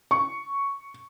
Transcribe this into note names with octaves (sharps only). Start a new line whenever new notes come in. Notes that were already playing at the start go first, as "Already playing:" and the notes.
C#6